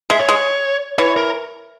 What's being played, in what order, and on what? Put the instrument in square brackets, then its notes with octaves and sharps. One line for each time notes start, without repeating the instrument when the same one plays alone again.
[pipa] G#3 [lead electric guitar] E5
[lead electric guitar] C#5
[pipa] G#3
[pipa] E3 [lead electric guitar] C#5
[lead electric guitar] A#4